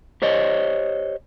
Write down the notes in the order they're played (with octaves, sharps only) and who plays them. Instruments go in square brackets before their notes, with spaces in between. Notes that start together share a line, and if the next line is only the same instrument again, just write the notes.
[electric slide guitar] G4 C5 C#5 D#5